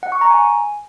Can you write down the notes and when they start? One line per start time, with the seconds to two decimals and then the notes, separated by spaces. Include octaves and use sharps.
0.03 F#5
0.12 C#6
0.21 A#5
0.30 G#5